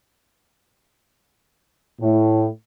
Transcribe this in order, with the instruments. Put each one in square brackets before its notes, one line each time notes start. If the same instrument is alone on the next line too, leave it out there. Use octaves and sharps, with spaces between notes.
[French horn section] A2